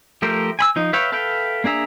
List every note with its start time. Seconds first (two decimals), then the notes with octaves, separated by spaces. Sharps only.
0.22 F3 A3 G4 A#4 C5
0.59 G#5 B5 E6
0.76 F3 D#4
0.93 B4 C#5 E5 F5 G5
1.12 A4 B4 E5 F5 G5
1.64 A#3 D4 G#4 E5 A#5